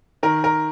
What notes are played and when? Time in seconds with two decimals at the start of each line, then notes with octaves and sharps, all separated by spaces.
0.23 D#3 A#4
0.44 A#4